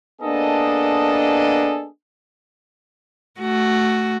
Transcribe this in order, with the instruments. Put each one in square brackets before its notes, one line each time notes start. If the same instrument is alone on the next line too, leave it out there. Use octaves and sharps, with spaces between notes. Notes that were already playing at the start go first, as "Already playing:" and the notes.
[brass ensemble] A#3 B3 D4 G#4 A4 D#5
[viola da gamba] A3 F#4